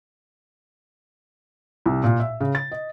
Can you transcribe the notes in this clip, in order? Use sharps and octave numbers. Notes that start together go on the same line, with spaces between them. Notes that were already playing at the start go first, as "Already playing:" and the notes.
C2
A#2
E5
C#3
A6
D#5